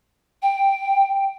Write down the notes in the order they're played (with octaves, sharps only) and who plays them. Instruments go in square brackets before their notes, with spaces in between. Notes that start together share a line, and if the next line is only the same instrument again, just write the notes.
[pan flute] G5